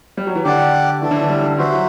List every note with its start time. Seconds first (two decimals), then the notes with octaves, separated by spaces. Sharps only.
0.17 G3
0.27 F#3
0.35 E3
0.44 D3 G4 D5 F#5
1.01 E3 A3 D4 A4
1.11 D3
1.21 E3
1.30 G3
1.44 D3
1.58 E3 F#4 C5 E5
1.73 F#3